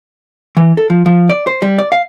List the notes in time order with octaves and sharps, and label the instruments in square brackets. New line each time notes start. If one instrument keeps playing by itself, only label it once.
[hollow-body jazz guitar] E3
A4
F3
F3
D5
C5
G3
D5
F5